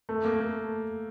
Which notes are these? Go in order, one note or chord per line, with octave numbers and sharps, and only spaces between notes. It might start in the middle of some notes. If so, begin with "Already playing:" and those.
A3
A#3
A3